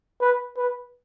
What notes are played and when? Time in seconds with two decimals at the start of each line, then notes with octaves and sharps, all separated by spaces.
0.21 B4
0.57 B4